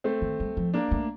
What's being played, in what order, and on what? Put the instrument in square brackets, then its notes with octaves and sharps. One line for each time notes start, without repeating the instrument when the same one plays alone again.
[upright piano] A3 C4
[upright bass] D#3
G3
F3
[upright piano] A#3 D4
[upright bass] A3